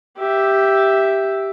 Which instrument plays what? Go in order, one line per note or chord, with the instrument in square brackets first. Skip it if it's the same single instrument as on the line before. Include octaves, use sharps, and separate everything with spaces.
[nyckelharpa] G4 E5